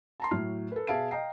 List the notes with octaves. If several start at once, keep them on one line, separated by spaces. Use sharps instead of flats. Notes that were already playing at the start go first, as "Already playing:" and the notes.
A5 A#5 C6
A2 F#3 F6 C7
A4 B4
B2 G#4 E5 F5 A5 D7
D#5 F5 G5 A#5 C7